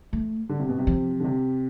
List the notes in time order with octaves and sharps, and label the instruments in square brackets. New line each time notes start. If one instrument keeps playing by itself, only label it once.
[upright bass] A3
[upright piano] D3
C3
B2
C3
[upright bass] F3
[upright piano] D3
C3